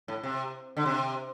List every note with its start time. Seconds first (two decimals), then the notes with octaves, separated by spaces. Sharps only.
0.08 A2
0.23 C3
0.77 D3
0.86 C3